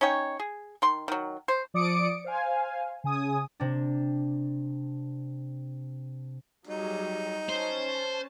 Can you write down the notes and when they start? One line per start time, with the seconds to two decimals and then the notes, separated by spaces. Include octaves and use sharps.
0.01 C#4 D#4 C#5 G5
0.40 G#4
0.82 D#3 C6
1.08 D#3 F#3
1.48 C5
1.74 F3 D5 D6 D#6 C#7 D7
2.24 C5 F5 G#5
3.04 C#3 G#5 D#6
3.60 C3 D4
6.67 F#3 G3 D#4 G#4
7.49 C#4 C5 A5